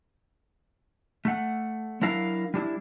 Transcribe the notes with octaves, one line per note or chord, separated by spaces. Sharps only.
A3 F#5
F#3 D4 E4 A#4 F5
G3 D4 E4